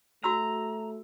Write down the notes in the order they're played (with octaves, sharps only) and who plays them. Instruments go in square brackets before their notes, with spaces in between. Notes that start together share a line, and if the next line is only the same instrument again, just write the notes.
[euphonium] A3 [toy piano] F#4 E6 [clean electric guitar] A#5